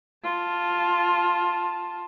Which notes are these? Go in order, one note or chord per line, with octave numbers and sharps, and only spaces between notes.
F4 A5